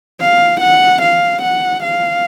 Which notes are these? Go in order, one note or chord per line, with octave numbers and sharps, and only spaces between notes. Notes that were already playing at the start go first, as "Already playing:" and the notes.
F5
F#5
F5
F#5
F5